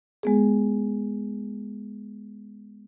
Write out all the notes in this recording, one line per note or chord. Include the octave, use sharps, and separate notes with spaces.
G#3 B3 G#4